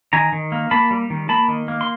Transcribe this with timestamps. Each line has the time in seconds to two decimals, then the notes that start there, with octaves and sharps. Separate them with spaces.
0.13 D#3 G#5 A#5
0.33 D#3
0.52 A#3
0.71 A#3 A5 B5
0.91 G3
1.10 D#3
1.29 A#3 A5 B5
1.49 D#3
1.68 A#3
1.81 C6